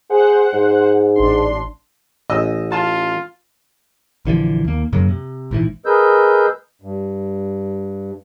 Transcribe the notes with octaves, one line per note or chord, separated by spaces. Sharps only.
G#4 C5 F#5
G#2
A1 D4 C6
A1 D#5 E6
F4 A5
A#1 D3 E3 F3
D#2 A#3
F#2 C#3 F#3 A#3
C3
A#1 G#2 E3
G#4 A#4 B4 D#5 E6 G6
G2